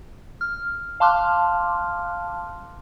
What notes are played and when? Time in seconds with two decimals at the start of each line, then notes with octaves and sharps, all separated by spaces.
0.41 F6
1.00 F5 A5 C6 D6 F6 F#6